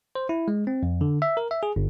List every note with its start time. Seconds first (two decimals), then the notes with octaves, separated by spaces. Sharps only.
0.15 C5
0.29 E4
0.48 G#3
0.67 C4
0.83 F2
1.01 D3
1.22 E5
1.37 A#4
1.51 E5
1.63 G#4
1.76 G1